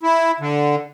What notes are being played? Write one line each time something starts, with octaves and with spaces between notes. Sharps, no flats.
E4
D3